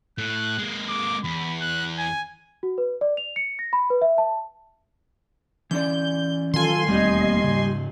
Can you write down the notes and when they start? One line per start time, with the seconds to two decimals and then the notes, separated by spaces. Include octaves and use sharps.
0.18 A2 F#6
0.59 G#3 A#3
0.88 D6
1.24 E2 B5
1.61 F#6
1.98 G#5
2.63 F#4
2.78 B4
3.01 D5
3.17 F7
3.36 C#7
3.59 A#6
3.73 B5
3.90 B4
4.02 E5
4.18 A5
5.71 E3 C#4 D5 G6
6.54 D#3 F3 F#3 F4 A4 G#5 C6
6.88 E1 D#2 G3 A3 C4 G4 D#5
7.44 G#2 C#3